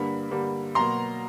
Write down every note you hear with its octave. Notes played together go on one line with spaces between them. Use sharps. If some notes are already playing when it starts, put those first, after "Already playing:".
Already playing: G2 D3 G3 A#3 B5
G2 D3 G3 A#3
B2 F#3 A#3 A#5 C6